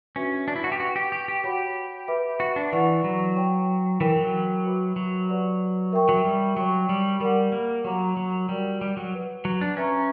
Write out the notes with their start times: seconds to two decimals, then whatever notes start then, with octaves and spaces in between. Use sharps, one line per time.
0.16 C#4 D4 F#4 B4 E5
0.48 D4
0.56 E4
0.64 F#4
0.72 G4
0.80 F#4 B4 F#5 C#6
0.96 G4
1.12 G4
1.28 G4
1.44 F#4 G4 C#5 F#5 B5
2.08 B4 E5 B5 D6
2.40 F#4
2.56 D4
2.72 E3 E4 B4 D5 F#5 C#6
3.04 F#3
3.36 C#5 G5 C#6
4.00 E3 A#4 C#5 G5 B5 D6
4.16 F#3
4.64 F#4 B4 E5 B5 D6
4.96 F#3
5.29 G4 B4 D5 F#5 C#6
5.92 A#4 E5 G5 C#6
6.09 F#3
6.24 G3
6.57 F#3 C#5 G5 C#6
6.89 G3
7.20 G3 A#4 D5 F#5
7.52 A#3
7.85 F#3 G4 C#5 F#5 A#5 D6
8.17 F#3
8.49 G3 F#4 A#4 D5
8.81 G3
8.97 F#3
9.13 G4 B4 F#5
9.45 F#3
9.61 D4
9.77 C#4 B4 E5 A#5 C#6